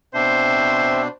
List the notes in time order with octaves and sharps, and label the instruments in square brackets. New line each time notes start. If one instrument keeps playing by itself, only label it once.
[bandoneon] B2 D4 [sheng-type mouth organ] C4 E5 [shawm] C5